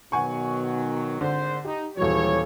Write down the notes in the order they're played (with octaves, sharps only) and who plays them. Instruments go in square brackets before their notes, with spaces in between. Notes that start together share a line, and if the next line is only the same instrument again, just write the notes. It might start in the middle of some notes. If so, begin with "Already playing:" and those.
[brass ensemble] B2 D#3 F#3 [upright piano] F#5 G#5 C#6
[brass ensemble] G#1 C5 [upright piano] D3
[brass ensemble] D#4 [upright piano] G4
[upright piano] D#1 F#3 [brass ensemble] E3 G3 C#5